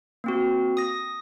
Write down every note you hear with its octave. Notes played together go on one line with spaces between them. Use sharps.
A#3 C4 F#4
D#6 A#6